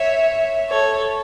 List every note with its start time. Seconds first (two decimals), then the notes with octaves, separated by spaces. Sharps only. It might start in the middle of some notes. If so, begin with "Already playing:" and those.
Already playing: C#5 E5
0.68 A4 C#5